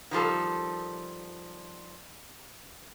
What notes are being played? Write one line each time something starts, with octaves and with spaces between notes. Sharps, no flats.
D#3 F3 G3 A4